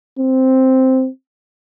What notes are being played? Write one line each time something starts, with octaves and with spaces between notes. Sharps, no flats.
C4